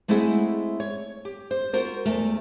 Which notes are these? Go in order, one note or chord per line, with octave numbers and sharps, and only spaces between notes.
G#3 A3 C4 E4 G#4 F#5
C#5
G4
C5
F4 F#4 A#4 C5
E2 A3 A#4